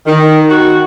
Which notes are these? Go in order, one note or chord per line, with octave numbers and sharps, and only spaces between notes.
D#3
F#4